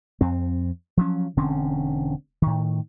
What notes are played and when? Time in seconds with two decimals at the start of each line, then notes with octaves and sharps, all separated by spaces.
0.21 F2 C4
0.97 F3 F#3 C#4
1.37 E1 D3 C4 C#4
2.42 A2 D#3